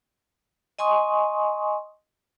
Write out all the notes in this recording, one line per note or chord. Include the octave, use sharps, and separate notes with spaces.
D#5 G#5 C6 C#6 D#6